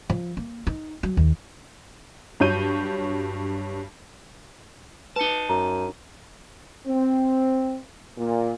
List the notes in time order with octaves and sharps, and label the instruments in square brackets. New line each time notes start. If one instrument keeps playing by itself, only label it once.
[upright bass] F3
A#3
D#4
F#3
D#2
[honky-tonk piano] G2 F#3 C#5 G6 D#7
[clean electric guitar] D#4 A5 [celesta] B4 C#7
[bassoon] F#2 [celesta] A#5
[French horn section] C4
A#2